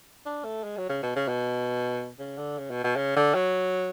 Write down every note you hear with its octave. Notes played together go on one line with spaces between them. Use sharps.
D4
A3
G#3
F#3
C#3
B2
C#3
B2
C#3
D3
C#3
B2
B2
C#3
D3
F#3